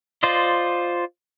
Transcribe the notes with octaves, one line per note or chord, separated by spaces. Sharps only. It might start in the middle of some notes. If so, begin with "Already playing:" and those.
F4 C5 D5 D#5